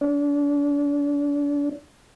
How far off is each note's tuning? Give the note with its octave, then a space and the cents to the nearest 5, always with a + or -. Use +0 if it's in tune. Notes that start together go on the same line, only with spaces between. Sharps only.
D4 -35